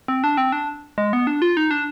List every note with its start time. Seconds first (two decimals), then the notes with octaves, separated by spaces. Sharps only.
0.08 C4
0.24 D4
0.37 C4
0.52 D4
0.98 G#3
1.13 B3
1.27 D4
1.42 F4
1.57 D#4
1.71 D4